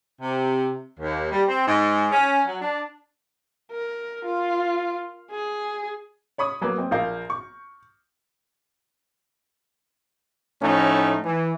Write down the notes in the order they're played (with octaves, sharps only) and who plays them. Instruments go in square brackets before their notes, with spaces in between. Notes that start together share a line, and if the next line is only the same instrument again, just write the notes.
[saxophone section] C3
D#2
G3
C4
G#2
C#4
F#3
D4
[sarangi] A#4
F4
G#4
[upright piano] C#5 B5 C#6 D#6
F#3 A#3 B4
C4
A#1 A#4 F5 G6
C#6
[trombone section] A2 F3 A3 C#4 D#4
E3